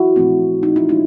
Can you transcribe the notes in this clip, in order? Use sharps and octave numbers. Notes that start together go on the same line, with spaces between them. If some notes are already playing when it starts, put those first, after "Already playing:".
Already playing: E4 F#4
A#2 F3 A3 C4
D#4
E4
G#3 C#4 D#4 F4